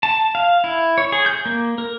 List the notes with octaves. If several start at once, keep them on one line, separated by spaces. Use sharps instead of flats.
A5
F5
E4
C#5
G#4
G6
A#3
A#4